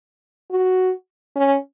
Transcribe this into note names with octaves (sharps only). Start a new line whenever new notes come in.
F#4
C#4